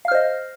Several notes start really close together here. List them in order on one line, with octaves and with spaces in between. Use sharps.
F5 F6 C5 D#5